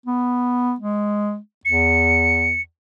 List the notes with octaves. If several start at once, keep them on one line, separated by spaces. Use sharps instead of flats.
B3
G#3
E2 C#7